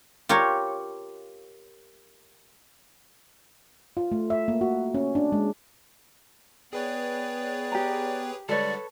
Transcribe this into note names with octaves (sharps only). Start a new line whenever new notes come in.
F4 G4 A#4 C#5
F4
A3
E5
A#3
F#4
C#4
D4
G#3
B3 G#4 B4 C#5 D5 G5
G4 A#5
D3 G3 G#3 A4 B4 C#5 D5